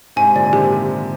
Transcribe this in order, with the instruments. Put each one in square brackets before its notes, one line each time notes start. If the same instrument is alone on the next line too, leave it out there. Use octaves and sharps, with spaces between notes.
[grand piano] G#2 C3 [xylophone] G#5
[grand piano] A#2 D3 [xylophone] D5
[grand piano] C3 D#3 [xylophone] G4